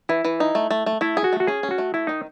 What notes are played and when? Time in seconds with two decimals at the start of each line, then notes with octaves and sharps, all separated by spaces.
0.09 E3 E4
0.25 E3
0.40 D#4
0.55 A3
0.70 A3
0.86 A3
1.01 A3 E4
1.17 G#4
1.24 F#4
1.33 A3
1.40 F#4
1.47 C#4 G#4
1.63 C#4
1.71 F#4
1.78 A3
1.94 A3 E4
2.07 D#3 D#4